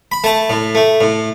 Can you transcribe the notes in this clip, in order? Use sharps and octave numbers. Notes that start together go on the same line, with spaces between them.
B5
A3 A5
A2
A3
A2